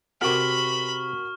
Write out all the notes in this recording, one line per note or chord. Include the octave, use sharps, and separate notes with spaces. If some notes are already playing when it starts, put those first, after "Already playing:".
C3 F#4 G4 A4 A#4 B5 C#6 F6